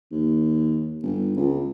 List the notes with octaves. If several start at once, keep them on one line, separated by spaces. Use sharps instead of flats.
D#2
G1
C#2